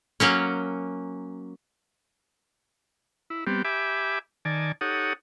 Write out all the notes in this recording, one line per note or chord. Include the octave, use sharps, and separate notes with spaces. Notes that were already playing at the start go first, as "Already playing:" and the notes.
F#3 A#3 C#4
E4
G3 B3 C4 G4
G4 E5 G#5 B5 D6
D#3 D5 G#5 A5
D#4 G4 A4 C#5 F#5 D#6